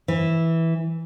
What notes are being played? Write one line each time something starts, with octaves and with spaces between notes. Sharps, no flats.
E3